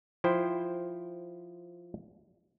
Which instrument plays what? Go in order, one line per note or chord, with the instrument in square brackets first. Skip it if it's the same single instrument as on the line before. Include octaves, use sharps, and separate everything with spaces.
[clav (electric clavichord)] F3 E4 C5 G5